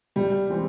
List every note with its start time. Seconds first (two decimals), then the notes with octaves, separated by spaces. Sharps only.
0.16 C3 G3
0.49 E3 G#3 C4